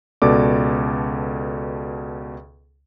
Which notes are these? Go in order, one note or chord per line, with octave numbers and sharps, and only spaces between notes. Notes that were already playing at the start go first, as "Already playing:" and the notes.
C#2 B2 A4 D5 D6